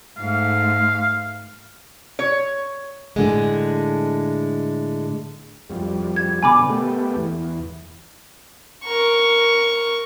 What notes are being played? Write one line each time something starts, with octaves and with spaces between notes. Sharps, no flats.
G#2 A3 F5
C#5
A2 D3 G#3
F2 G3
G#6
B2 D3 G#5 B5 D6
A3 B3 G4
E2
A#4 C#6